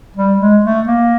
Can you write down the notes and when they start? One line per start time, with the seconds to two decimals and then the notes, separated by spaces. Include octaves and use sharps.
0.16 G3
0.40 G#3
0.64 A3
0.87 A#3